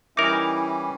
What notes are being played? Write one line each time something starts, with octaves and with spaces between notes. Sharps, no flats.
E3 G3 C#4 D#4 E4 A#4 D6